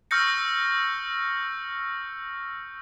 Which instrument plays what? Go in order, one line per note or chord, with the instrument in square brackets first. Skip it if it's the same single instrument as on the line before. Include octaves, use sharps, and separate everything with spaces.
[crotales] C#6 E6 F6 G6 A#6 C#7